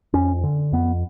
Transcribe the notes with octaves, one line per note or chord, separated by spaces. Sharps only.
F2 C#4
D3
F2 B3